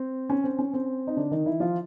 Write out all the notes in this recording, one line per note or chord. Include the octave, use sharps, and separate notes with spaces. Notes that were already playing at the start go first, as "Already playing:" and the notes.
Already playing: C4
C#4
C4
C#4
C4
D#4
D3 D4
D#3 D#4
E3 E4
F3 F4